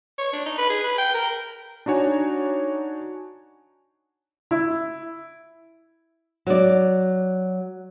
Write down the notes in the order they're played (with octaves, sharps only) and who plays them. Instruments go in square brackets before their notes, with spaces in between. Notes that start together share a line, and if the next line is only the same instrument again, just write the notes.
[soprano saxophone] C#5
D4
D#4
B4
G#4
B4
G5
A#4
[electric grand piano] D4 D#4 F#4 C#5 G#5
[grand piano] E4
[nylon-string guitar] F#3 D5